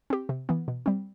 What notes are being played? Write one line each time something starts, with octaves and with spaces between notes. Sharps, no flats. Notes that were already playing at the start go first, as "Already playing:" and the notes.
C4 G4
C3
E3 B3
B2
G3 C4